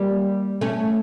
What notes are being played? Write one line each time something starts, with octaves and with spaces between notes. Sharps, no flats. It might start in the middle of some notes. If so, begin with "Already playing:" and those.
Already playing: G3 A#3
A3 C#4